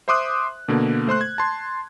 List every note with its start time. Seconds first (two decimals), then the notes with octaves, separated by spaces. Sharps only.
0.08 C5 E5 C6 D6 D#6 F#6
0.68 B2 D3 A#3
1.07 A3 C5 C6 F#6
1.21 G#6
1.38 A5 C6